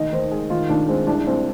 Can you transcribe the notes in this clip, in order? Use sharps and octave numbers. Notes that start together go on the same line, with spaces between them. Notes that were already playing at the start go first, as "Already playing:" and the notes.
Already playing: D#2 D#5
D#3 C5
G#3 G#4
D#3 F4
D#2 D4
G#3 C4
C2 D4
C2 C4